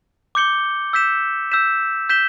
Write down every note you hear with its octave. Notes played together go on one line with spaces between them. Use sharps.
D6 G6 C#7 G7
E6 G6 B6 E7
E6 G6 B6 E7
G6 B6 E7 G7